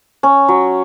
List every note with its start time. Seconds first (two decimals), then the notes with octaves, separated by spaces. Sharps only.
0.23 C#4
0.49 F#3